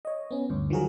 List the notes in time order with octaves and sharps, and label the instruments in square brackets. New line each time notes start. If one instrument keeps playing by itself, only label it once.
[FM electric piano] C#5 D#5
B3 C#4
D2 G2
D#3 F3 F#3 F#4 G#4 A#4